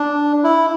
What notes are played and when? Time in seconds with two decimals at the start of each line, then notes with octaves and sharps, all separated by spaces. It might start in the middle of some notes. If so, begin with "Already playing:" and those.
Already playing: D4
0.44 E4